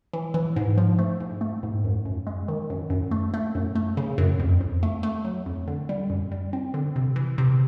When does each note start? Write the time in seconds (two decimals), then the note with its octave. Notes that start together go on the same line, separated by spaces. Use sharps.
0.13 E3
0.34 E3
0.56 G#2
0.78 F3
0.99 A3
1.20 G#2
1.41 A3
1.63 G#2
1.84 F#2
2.05 F#2
2.27 G#3
2.48 D#3
2.70 F#2
2.90 F#2
3.11 A3
3.34 A3
3.55 F#2
3.75 A3
3.97 C#3
4.18 F#2
4.40 F2
4.61 F2
4.83 A3
5.03 A3
5.25 F#3
5.46 F2
5.67 D3
5.89 G3
6.10 F#2
6.32 G3
6.53 C4
6.74 D3
6.96 C3
7.16 E3
7.38 C3